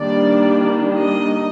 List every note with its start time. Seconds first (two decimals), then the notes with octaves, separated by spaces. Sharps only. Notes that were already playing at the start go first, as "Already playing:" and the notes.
Already playing: D#3 G3 A#3 D4 D5
0.98 D#5